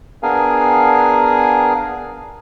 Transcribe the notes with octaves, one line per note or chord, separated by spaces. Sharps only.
B3 D4 G#4 A#4 F5 G#5